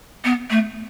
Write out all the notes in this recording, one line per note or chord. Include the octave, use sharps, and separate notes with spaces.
B3
A3